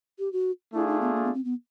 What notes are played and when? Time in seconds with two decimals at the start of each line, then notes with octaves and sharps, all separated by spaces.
0.19 G4
0.33 F#4
0.74 A3 D4 E4 F4 G#4
0.87 D#4
1.01 B3
1.15 A#3
1.24 B3
1.34 C4
1.45 B3